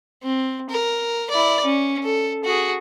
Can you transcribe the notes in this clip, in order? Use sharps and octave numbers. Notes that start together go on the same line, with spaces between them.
C4
A#4
E4 D5
C#4
A4
F#4 G#4